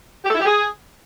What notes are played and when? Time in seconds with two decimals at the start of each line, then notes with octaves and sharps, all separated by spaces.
0.24 G4
0.29 A4
0.34 E4
0.40 G4
0.45 G#4